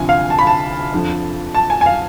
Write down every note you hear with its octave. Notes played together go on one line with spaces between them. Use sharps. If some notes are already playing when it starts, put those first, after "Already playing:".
Already playing: D2 C3 F3 G#5
F5
A5
B5
A5
F2 D3 F3
A5
G#5
G#5
F5